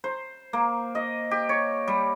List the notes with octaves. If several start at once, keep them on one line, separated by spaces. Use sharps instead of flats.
C5
A#3
D#5
G4
C#5
G3